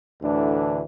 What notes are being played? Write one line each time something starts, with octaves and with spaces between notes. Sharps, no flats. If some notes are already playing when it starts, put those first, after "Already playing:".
D2 A2 D3 E3 D4